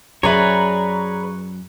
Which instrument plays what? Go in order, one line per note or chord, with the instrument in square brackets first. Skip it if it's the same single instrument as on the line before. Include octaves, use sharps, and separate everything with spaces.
[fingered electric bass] F#2 [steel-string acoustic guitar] G#4 D5 E5 [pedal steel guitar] B4 C#5 [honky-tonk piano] A#5